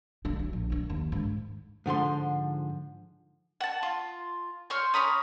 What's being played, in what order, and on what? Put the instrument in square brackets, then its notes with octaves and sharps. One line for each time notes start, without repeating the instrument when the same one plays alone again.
[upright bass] D3 G3
F#3
A#1
D#3 D4
D#2
G#2 D3
[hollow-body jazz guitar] G#2 D3 F3 C6
[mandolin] F#5 A5
F4
C#5 C6 F6 G6
C#4 A#5 B5 D#6